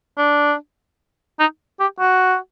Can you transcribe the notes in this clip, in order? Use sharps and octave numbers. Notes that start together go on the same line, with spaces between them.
D4
D#4
G4
F#4